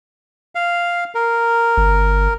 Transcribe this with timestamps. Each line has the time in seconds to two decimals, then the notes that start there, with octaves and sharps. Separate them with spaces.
0.55 F5
1.15 A#4
1.77 G1